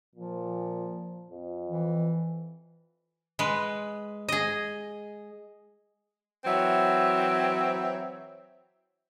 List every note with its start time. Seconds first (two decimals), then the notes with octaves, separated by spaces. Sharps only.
0.16 A#2 F3
1.31 F2
1.68 E3
3.39 G#3 B4
4.28 G#4 D#5
6.45 E3 F#3 C4 C#5 E5